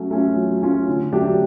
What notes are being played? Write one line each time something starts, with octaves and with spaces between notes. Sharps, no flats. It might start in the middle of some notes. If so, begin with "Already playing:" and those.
Already playing: F#3 A3 C#4
A3 C#4 F4
F#3
A3 C#4 F4
D3
F#3 A3 D4 G4